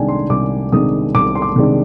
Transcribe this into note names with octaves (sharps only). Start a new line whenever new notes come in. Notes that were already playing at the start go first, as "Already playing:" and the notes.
Already playing: C2 C3 D#3 G#3 D4 G5 G#5
C6
C2 D6
C3 D#3 G#3 D4 D#6
C2 D6
C6
D6
C3 D#3 G#3 D4